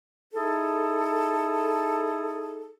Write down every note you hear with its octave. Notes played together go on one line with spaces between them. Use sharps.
D#4 E4 G#4 A4